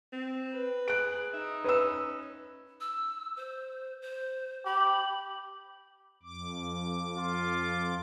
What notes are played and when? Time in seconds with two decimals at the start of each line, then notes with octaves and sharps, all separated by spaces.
0.13 C4
0.52 B4
0.88 G#4 F#6 D7
1.33 D#4 E5
1.64 C#4 B4 E6
2.81 E6
3.36 C5
4.02 C5
4.66 G4 B5
6.23 F2 D6
7.18 F4